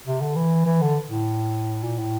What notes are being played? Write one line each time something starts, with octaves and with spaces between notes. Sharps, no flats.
C3
D3
E3
E3
D3
A2
A#2
A2